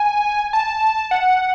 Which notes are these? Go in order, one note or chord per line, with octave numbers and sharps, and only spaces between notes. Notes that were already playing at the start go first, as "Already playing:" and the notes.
Already playing: G#5
A5
F#5